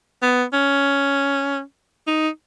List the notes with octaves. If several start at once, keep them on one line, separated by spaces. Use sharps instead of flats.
B3
C#4
D#4